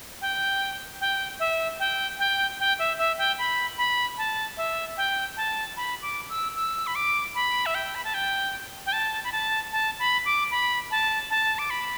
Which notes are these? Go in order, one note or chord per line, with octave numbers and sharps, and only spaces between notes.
G5
G5
E5
G5
G5
G5
E5
E5
G5
B5
B5
A5
E5
G5
A5
B5
D6
E6
E6
B5
D6
B5
E5
G5
B5
A5
G5
G5
A5
B5
A5
A5
B5
D6
B5
A5
A5
D6
B5